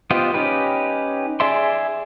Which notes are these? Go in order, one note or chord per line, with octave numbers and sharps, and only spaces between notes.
B3 F4 G4 C5 D#5
C#4 D#4 G4 B4
G#4 D5 E5 C6